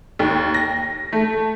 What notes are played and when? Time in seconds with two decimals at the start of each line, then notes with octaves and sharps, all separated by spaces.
0.19 D#2
0.54 A#6
1.12 A3